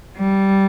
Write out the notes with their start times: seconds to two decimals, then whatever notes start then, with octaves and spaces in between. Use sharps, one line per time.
0.17 G3